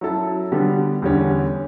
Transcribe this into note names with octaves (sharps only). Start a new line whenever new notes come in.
F#3 C#4 E4 A4
D3 G3 B3
E2 D3 G3 C#4